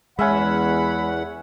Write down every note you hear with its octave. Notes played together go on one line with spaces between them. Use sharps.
E2 G#3 C#4 E5 F#5 B5